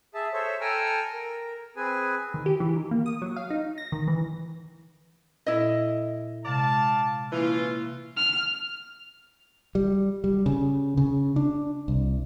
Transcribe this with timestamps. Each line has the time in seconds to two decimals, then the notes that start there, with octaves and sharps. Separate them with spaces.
0.14 G#4 E5 A5
0.33 A4 C5 C#5 E5
0.61 A4 G5 G#5 A#5 E6 F6
1.13 A#4
1.77 C4 G#4 B4 G#5
2.34 D#3
2.46 G4
2.60 E3
2.76 D#3
2.91 A#3
3.06 D#6
3.22 F#3
3.36 F5
3.50 D#4
3.78 A#6
3.92 D#3
4.08 E3
5.46 A#2 E4 A4 D#5
6.46 C3 G#3 D5 F5 A5
7.32 E3 A#3 C#4 E4 F4 B4
8.17 F6
9.75 G3
10.24 G3
10.46 C#3
10.97 C#3
11.36 D4
11.88 C2